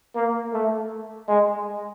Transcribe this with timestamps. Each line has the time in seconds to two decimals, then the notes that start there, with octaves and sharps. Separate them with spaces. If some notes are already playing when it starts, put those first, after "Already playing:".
0.15 A#3
0.52 A3
1.28 G#3